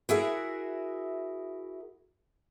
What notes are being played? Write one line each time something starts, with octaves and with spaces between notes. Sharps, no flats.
E4 F#4 G#4 A#4 E5 F#5